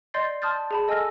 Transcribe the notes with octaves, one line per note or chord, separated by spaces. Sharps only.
D5 D#5 C6 G6 A6 C7
A5 C6 D#6 F6 G6 A6
G#4 A5 B5
A4 D#5 G#5 E6 F6 A#6